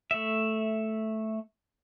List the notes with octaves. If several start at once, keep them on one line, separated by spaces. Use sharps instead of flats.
A3 E5